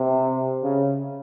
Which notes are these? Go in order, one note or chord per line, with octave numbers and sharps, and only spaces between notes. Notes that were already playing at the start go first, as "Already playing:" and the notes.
Already playing: C3
C#3